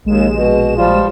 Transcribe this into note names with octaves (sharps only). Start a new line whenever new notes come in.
A#1 D#2 G#3 E7
B2
F3 G3 F4